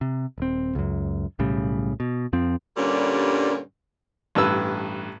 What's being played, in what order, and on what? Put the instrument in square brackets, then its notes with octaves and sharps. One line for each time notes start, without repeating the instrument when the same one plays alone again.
[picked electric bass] C3
D#1 C4
C#2 F#2
B1 A2 C#3 G3
B2
F2 F3 C4
[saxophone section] G2 A#2 D3 G3 C#4
[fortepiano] A1 G2 B4 E6